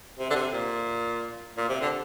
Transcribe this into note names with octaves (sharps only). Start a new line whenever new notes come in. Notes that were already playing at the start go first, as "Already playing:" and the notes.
C3
D3
C3
A#2
A#2
C3
D3